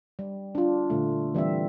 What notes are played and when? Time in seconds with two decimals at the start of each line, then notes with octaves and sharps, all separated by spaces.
0.19 G3
0.55 D4 F4
0.90 A#2 D3 A3
1.35 E3 G3 C4 E5